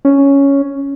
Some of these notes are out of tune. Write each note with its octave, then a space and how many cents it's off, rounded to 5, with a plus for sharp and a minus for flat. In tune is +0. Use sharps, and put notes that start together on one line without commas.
C#4 +5